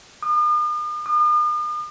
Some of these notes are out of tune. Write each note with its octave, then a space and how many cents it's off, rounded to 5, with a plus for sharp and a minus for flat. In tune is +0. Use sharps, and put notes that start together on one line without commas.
D#6 -45
D#6 -45